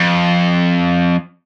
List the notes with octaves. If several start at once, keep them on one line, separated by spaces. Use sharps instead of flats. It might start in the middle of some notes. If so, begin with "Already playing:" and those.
Already playing: F2